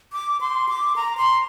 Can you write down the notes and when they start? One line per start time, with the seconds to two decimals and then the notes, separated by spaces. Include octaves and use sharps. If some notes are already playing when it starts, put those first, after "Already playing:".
0.13 D6
0.41 C6
0.69 D6
0.96 A#5
1.17 C6